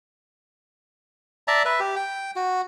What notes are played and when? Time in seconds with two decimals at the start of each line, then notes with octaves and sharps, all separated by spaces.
1.48 D5 E5 A5 A#5
1.65 B4 E5
1.80 G4
1.96 G5
2.36 F#4